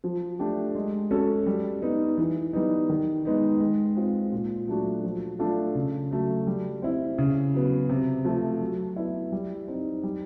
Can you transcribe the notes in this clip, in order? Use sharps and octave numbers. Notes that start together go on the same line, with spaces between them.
F3
A3 D4 G4
G#3
C#4 F#4 A4
G3
B3 D#4
E3
G3 B3 D#4
D#3
G#3 B3 D#4
G#3
C4 F4
A#2
F#3 A3 D4 F#4
F3
A3 D4 F4 A4
C#3
F#3 A3
G3
C4 E4
C#3
F#3 B3
C3
F3 A3
F#3
B3 E4
G3
C4 D#4
G3